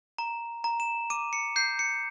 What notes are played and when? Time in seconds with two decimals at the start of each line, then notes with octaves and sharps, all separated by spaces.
0.19 A#5
0.64 A#5
0.80 E7
1.10 D6 D#7
1.33 C#7
1.56 G6 C7
1.79 C#7